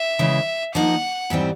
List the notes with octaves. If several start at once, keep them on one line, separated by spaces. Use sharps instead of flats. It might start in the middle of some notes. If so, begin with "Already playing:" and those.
Already playing: E5
C#3 E3 G#3
F3 A#3 D#4 F#5
G#2 E3 G3 C4